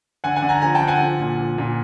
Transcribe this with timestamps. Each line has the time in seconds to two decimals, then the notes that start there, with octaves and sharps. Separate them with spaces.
0.24 D3 F#5 G#5
0.36 F#5 G#5
0.42 D3
0.49 G#5 A#5
0.62 F3 G#5 A#5
0.75 G5 A5
0.81 D3
0.87 F#5 G#5
1.01 F3
1.20 A#2
1.38 F3
1.58 A#2